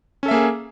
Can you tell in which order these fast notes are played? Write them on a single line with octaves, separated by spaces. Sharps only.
C#4 A4 E5 A#3 G#4